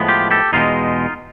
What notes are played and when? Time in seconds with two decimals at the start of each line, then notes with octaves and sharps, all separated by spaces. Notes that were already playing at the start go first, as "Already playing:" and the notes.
Already playing: A2 F3 G#3 B3
0.08 F4 G4
0.31 G4 A4
0.53 E2 B2 G#3 D#4 F4